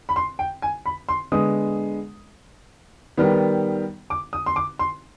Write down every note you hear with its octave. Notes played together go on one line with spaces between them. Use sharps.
B5
C6
G5
G#5
B5
C6
D3 G#3 B3 D#6
D#3 G3 B3
D6
D#6
C6
D6
C6